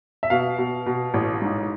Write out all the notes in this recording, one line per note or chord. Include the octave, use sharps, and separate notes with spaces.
E5
B2 F5
B2
B2
A1
G#2